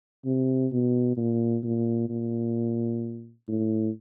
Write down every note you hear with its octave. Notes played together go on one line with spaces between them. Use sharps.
C3
B2
A#2
A#2
A#2
A2